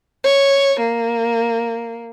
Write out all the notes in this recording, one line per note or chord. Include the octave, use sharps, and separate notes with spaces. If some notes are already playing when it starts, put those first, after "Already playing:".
C#5
A#3